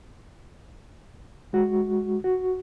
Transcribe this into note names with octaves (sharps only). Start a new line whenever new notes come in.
G#3 F#4
F#4